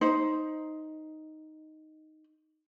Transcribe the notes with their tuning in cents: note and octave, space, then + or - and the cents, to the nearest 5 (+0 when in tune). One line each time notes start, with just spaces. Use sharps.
D#4 +0 C5 +0